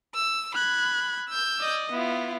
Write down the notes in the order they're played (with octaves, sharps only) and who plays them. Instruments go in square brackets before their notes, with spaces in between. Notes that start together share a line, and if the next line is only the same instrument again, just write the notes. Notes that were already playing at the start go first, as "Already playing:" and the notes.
[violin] E6
[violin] B5 [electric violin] F#6 G#6
[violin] E6 G6
[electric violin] D5 D#5
[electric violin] B3 [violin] E4 F4